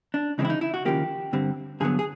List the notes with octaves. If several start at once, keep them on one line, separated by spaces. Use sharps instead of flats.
D4
C#2 C#3 E3 G#3 C4 D#4
E4
D#4
E4
F#4
D#2 C#3 F3 A#3 G4
G2 D3 G3 C4
G2 D3 F#3 B3 G#4
G#4